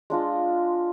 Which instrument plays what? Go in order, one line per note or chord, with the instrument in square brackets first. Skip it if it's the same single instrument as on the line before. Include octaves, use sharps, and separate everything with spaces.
[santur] G#3 D4 F4 D#5